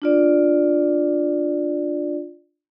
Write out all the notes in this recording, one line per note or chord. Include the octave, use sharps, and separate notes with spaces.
D4 F4 D5